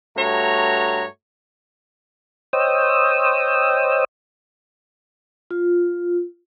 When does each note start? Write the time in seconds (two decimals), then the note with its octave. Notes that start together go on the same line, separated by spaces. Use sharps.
0.17 G2 A3 F#4 C#5 A#5
2.53 C5 C#5 D#5 G5 D#6 E6
5.51 F4